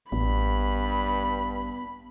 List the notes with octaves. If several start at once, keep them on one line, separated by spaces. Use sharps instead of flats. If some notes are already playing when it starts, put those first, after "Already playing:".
A1 G2 B3 B5